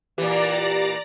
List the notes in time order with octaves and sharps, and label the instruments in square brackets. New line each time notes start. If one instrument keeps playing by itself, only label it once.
[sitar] A#2 E3 [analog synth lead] G4 [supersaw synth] D5 A#5